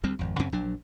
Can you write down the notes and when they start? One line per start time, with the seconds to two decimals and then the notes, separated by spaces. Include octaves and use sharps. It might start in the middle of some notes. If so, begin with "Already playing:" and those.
0.04 D2 G3 C4
0.19 G#1 F2
0.39 F#2 C#3 C4 C#4
0.52 A#1 F#3 D4